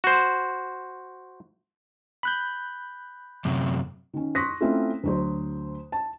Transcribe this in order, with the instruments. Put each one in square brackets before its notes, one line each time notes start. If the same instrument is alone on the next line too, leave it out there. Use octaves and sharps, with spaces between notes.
[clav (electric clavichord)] F#4 C5
[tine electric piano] B5 F#6 G6
[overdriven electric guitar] F#2 C3
[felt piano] D#3 C#4
C6 C#6 D#6 F#6 A#6 B6
A3 C4 C#4 E4 F4 A4
D2 F#3 C5
A5